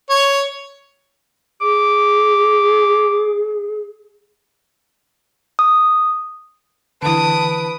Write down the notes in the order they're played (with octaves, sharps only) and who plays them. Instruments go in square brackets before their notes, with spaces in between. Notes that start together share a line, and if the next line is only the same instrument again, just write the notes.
[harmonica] C#5
[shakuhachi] G#4 [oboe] D6
[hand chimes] D#6
[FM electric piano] D3 E3 [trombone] B4 [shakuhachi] A5 [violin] D#6 D7